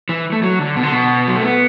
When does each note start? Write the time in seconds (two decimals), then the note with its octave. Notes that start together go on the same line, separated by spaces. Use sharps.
0.09 E3
0.32 A3
0.43 F#3
0.59 D3
0.76 B2
0.83 D3
0.92 B2
1.27 F#3
1.35 A3
1.42 B3